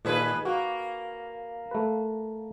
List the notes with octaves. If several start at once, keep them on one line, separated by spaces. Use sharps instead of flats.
D#2 A#2 G#4 B4
A#3 F#4
A3 B4